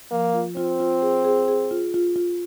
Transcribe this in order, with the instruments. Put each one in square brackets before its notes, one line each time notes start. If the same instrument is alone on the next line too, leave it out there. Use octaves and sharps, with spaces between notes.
[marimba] F3 [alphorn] A#3
[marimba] F4
[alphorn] C4 [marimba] F4
[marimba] F4
G#4
G#4
G#4
F4
F4
F4